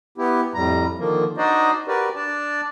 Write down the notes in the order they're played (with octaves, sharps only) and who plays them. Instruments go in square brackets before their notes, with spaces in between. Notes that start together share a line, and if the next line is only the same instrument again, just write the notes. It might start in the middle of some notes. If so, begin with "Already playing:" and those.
[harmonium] B3 E4 G4
F2 A2 G3 A#5
D3 D#3 F3 A#3
D4 D#4 F#4 C5 D5 D#5
F#4 G4 A#4 B4 D5
D4 D5 A5